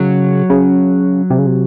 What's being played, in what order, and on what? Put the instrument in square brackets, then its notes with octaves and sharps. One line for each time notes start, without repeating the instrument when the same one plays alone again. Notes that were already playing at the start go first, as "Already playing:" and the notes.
Already playing: [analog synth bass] C#3 [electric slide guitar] F#3
[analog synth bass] C#3
C3
C#3
C3